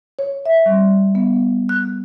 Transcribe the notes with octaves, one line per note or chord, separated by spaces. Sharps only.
C#5
E5
G3
B3
F#6